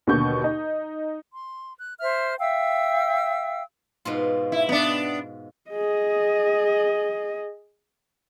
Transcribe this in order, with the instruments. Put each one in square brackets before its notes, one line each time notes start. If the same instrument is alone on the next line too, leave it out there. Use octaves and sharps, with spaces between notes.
[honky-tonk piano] D#2 B2 D3 C#6 G6
D#4
[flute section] C6
F#6
C5 E5 F6
E5 F5 G5 E6
[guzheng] G#2 B2 F4
[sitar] E4
B3 D4
[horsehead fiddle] G#4 D#5